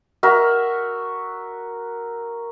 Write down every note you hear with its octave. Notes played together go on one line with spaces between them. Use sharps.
F#4 A#4 E5